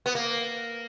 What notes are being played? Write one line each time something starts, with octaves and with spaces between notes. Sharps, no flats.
B3
A#3